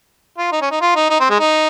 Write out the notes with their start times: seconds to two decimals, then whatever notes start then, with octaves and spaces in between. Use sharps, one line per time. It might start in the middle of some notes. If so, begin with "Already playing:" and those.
0.38 F4
0.52 D#4
0.61 C#4
0.71 D#4
0.81 F4
0.95 D#4
1.10 D#4
1.20 C4
1.30 G#3
1.39 D#4